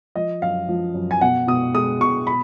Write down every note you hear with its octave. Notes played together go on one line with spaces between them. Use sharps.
F3 D#5
F#2 F5
F3
F#2
G#5
B2 F#5
B2 D#6
G#3 D#6
B2 C#6
B5